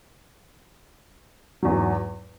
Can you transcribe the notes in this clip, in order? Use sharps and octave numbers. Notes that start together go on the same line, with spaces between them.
E2 G#2 F#3